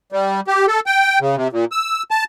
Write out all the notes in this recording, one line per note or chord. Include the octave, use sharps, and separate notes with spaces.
G3
G4
A4
G5
C#3
C3
A#2
E6
A5